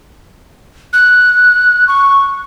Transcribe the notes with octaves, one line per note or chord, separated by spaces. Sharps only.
F#6
C#6